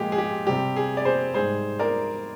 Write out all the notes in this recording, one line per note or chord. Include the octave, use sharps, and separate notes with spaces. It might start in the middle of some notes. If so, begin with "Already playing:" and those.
Already playing: A#2 F3 G#3 G4 G#4
G#4
G4
C3 G3 G4
G#4
D5
G#4 C5
G#2 G3 G#4 C5
A#4 D5